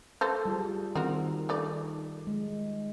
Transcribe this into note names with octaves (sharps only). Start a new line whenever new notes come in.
A3 A4 C5
G3 F4 G#4
D#3 C4 F#4 A#4
A3 D#4 D5
G#3